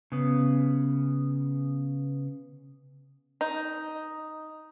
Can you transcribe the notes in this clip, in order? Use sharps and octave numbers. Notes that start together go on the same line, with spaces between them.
C#3 B3
D#4